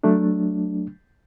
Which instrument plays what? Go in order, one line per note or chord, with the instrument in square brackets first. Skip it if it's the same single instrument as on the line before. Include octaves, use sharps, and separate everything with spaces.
[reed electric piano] F#3 A3 D4